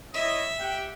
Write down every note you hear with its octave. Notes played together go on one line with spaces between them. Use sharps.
E4 C#5 D#5 E5
G4 F#5 G5